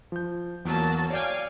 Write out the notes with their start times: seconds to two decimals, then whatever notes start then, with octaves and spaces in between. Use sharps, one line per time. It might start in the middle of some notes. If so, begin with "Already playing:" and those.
0.12 F3 G6
0.65 E2 F#3 A#3 A5
1.10 C#5 D5 F5 G5 G#5